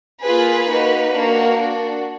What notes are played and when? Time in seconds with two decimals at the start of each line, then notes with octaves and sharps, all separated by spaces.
0.22 A#3 F4 G#4 B4
0.68 A#3 D#4 F#4
1.12 A#3 D4 F#4
1.57 D4 F#4